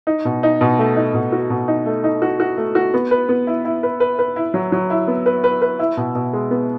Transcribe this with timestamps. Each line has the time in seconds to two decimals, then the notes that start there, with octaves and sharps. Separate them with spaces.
0.07 D#4
0.25 B2
0.43 D#4
0.61 B2
0.79 A3
0.97 D#4
1.14 B2
1.32 F#4
1.50 B2
1.68 D#4
1.86 A3
2.04 D#4
2.22 F#4
2.40 F#4
2.58 A3
2.75 F#4
2.94 B3
3.11 B4
3.29 B3
3.47 E4
3.65 E4
3.83 B4
4.00 B4
4.19 B4
4.36 E4
4.54 F#3
4.72 F#3
4.90 E4
5.08 B3
5.26 B4
5.44 B4
5.62 B4
5.79 E4
5.97 B2
6.15 B2
6.33 G#3
6.51 B3